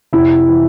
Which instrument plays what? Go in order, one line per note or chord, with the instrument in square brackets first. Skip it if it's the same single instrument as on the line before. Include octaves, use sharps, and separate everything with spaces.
[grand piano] F1 [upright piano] E4
[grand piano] E3